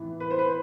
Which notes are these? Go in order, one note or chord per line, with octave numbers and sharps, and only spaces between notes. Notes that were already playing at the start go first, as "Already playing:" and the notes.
Already playing: A2 E3 B3
B4
C5
B4